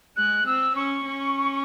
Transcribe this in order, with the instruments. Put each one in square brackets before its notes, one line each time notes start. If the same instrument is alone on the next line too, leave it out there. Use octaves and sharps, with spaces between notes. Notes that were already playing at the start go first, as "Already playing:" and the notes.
[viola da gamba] G#3 [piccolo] F#6
[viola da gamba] C4 [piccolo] E6
[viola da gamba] C#4 [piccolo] C#6
[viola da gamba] C#4